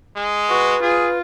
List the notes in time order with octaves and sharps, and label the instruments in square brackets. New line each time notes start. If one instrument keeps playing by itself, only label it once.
[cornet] G#3
[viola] F#4 [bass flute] B4
[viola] F4 [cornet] G#4